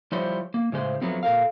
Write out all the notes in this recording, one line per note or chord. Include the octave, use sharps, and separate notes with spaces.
F3 G3 E4 C5 C#5
A#3
A2 C#3 G#3 C5
F3 F#3 A3 B3 C4
A#2 A4 A#4 F5